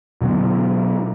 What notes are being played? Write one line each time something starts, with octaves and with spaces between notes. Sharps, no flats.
B2 D3 F#3 B3